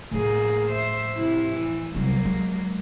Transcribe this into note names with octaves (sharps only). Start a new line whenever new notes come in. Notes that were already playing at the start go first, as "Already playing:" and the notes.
A2 F3 A#3 G#4
C5 E5
C3 E4
E3
C2 F#3 G3 A#3
G#3